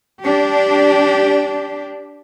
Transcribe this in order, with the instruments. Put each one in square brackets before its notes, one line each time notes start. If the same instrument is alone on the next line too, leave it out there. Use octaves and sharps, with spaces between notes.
[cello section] D4 G4